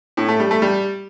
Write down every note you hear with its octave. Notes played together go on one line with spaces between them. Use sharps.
A2
A3
G3
A3
G3